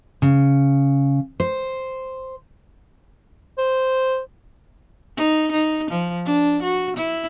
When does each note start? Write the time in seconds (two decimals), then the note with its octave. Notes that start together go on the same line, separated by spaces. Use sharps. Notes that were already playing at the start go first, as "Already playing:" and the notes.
0.22 C#3
1.40 C5
3.58 C5
5.17 D#4
5.52 D#4
5.91 F3
6.26 D4
6.63 F#4
6.97 E4